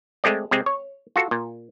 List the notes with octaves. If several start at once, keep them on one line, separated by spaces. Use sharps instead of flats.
G#3 A3 C4 D5
C3 G#3 C4
C#5
F4 F#4 A4
A#2